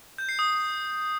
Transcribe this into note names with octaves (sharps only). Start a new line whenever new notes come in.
G6
C7
D#6